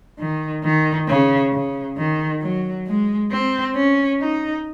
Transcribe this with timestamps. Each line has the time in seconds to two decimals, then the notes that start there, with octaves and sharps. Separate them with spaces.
0.19 D#3
0.63 D#3
1.08 C#3
1.53 C#3
1.97 D#3
2.42 F#3
2.87 G#3
3.31 C4
3.75 C#4
4.20 D#4